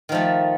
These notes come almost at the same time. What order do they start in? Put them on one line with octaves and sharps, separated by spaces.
D#3 F3 A3